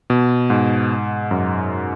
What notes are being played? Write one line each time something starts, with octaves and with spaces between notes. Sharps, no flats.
B2
G#2
F#2